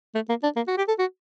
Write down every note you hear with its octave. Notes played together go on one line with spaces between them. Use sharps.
A3
A#3
D4
A#3
F#4
G4
A4
F#4